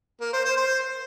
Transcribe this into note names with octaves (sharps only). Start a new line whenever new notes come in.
A#3
C5
C5
C5